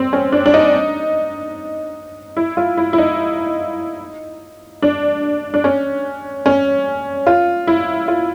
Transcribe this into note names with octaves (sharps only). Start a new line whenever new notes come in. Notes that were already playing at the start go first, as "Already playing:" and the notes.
Already playing: C4
C#4
D4
D4
D#4
E4
F4
E4
E4
D#4
D4
D4
C#4
C#4
F4
E4
F4